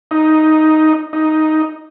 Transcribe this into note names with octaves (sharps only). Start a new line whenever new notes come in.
D#4
D#4